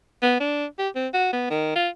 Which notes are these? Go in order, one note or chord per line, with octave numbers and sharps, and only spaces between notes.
B3
D4
G4
C4
F#4
B3
D#3
F4